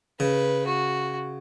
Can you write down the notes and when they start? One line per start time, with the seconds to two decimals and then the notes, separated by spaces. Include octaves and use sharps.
0.20 C#3 B4
0.66 F#4